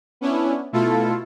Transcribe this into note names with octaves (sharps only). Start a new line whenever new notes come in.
B3 C#4 D4 E4
B2 A3 E4 F4 A4